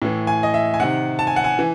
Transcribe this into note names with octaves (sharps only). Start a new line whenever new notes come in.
A2 E3
G#5
D#5
E5
G#5
C3 D#3 F#5
A5
G#5
F#5
G#5
E3